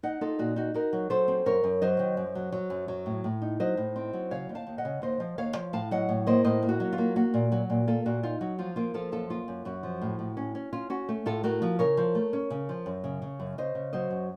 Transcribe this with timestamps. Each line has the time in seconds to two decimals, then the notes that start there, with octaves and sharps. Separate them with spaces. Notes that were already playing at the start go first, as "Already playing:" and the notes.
0.03 D#4 D#5 F#5
0.21 D#4 F4 A4
0.39 A#2 F#4
0.56 D#4 F#4
0.74 D#4 F#4 A#4
0.93 F#3
1.10 F#3 A4 C5
1.28 C4
1.46 F#2 A#4 C#5
1.64 F#2
1.82 F#3 C5 D#5
1.99 D#3
2.17 F#2
2.35 F#3
2.52 F#3
2.70 F#2
2.88 F#3
3.06 A2
3.24 A2
3.42 D#4
3.60 F#3 C5 D#5
3.77 A2
3.96 C4
4.13 F#3
4.31 C#3 C#5 F5
4.49 D#2
4.55 F5 A5
4.67 D#2
4.78 D#5 F#5
4.85 C#3
5.02 D#2 C5 D#5
5.20 F3
5.38 D#2 C#5 F5
5.56 F3
5.73 A2 F5 A5
5.91 F#3 D#5 F#5
6.09 A2
6.27 A#3 C5 D#5
6.44 A2 C5 D#5
6.62 A#3
6.69 F#4
6.80 F#3
6.93 F4
6.98 A#3
7.16 A#3 F#4
7.34 A#2
7.52 F#3 F#4
7.70 A#2
7.88 A#3 F4 A4
8.06 A#2 F#4
8.23 D#4 F4
8.41 F#3 F#4
8.59 F3 F4
8.76 A#3 F4
8.94 F3 F4 A4
9.12 F#2 F4 A4
9.30 A#3 F4
9.48 F#2
9.65 F#2 F#4
9.83 F3
10.02 A2
10.19 A2
10.37 C#4
10.55 C#4
10.73 C#4 F4
10.90 C#4 F#4
11.09 A3
11.26 A2 F4 A4
11.44 A3 F#4 A#4
11.62 F3
11.79 C#3 A#4 C#5
11.97 F3
12.15 A3
12.33 C#4
12.50 C#3
12.69 F3
12.86 F#2
13.04 C#3
13.22 C#3
13.40 F#2
13.58 C#3 C5 D#5
13.75 C#3
13.93 F#3 C5 D#5
14.11 F#2